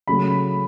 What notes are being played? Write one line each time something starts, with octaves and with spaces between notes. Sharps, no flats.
C#3 F#3 A3 B5